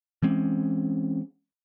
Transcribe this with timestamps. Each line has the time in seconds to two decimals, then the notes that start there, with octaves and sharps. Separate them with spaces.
0.22 E3 G#3 C4 C#4